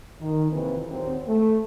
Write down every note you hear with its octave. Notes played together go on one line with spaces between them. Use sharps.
D#3
F2 C3 E3 A#3 B4
D#2 A#2 F#3 C4
A3